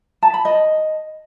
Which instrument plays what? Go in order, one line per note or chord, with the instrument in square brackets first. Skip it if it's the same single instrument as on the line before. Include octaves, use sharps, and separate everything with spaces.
[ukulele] A5
B5
D#5